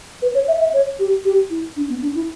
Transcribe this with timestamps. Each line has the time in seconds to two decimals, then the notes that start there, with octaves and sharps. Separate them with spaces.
0.22 B4
0.35 C#5
0.48 E5
0.60 E5
0.74 C#5
0.99 G4
1.25 G4
1.50 E4
1.76 D4
1.89 B3
2.02 D4
2.15 E4